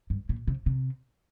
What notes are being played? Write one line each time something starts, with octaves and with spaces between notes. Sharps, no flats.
G2
A#2
C3
C3